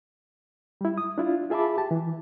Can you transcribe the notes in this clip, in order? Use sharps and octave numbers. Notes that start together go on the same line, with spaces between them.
G3 E4
D#6
D4 E4 F4
F4 G#4 E5 A5 B5 D6
G4 A5
E3